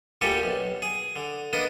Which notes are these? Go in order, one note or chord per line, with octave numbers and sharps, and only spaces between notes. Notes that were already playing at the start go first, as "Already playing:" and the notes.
D2 A#2 G3 G4 A4 G#5
B1
G#4
D3
A#3 B3 D4 D#5